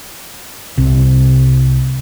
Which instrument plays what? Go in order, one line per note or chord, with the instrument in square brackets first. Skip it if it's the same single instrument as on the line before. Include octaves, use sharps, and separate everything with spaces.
[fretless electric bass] C2 C3